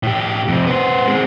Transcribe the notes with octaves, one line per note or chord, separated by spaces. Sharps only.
A2 G4
F2 C3
B3 C5
G#3 C4